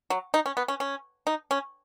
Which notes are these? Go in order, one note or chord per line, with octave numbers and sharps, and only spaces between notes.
F#3
D#4
C#4
B3
C#4
C#4
D#4
C#4